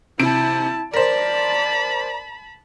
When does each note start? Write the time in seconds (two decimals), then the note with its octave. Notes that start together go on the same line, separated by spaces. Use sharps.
0.19 C3 E4 A5 D7
0.93 A#4 C5 D5 A5 B5